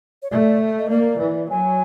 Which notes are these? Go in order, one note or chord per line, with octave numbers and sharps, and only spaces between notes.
C#5
A3 D5
D#5
A#3 D5
E3
F#3 G#5